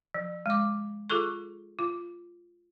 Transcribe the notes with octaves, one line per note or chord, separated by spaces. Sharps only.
F3
G#3 D6
F4 G#4 A4 C#6
F4